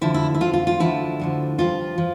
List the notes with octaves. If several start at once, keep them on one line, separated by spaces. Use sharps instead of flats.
D2 D3 F3 E4
E4
E4
D2 D3 F3 F4
F4
F4
D2 D3 F3 E4
D2 D3 F3
G2 F3 F4
F3